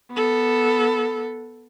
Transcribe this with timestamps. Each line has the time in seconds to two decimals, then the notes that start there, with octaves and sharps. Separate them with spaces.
0.12 B3 A4